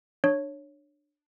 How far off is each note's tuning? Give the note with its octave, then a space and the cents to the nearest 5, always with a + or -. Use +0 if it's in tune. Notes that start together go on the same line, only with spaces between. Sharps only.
D4 +15 C#5 +0